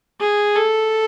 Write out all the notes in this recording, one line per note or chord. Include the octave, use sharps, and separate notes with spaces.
G#4
A4